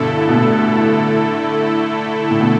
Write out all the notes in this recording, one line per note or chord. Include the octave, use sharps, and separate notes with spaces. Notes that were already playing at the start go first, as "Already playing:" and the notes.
Already playing: G2 B2 D3 A3 E4 A4
B2
A2
A2
B2